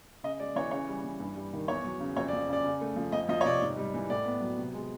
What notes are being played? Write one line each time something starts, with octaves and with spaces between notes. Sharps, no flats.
C#3 D#5
G#3 D5
E3 C#5
C#3 C#5
G3
E3
G2
G3
D#3
E2 C#5
F#3
C#3
F2 C#5
D5
F3
C#3 D5
C#3
A3
F3
F2 D#5
F3 D#5
C#5
C3 D5
G#2
G3
E3
A2 D5
B3
F#3
C3
G#3